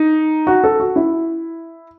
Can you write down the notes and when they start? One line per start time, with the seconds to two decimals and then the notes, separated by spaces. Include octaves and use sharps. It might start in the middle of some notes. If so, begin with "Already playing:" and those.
Already playing: D#4
0.47 F#4
0.64 A4
0.80 F#4
0.96 E4